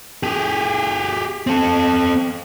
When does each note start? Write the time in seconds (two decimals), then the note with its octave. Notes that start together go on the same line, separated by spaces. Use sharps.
0.23 G4 G#4
1.47 C4 A4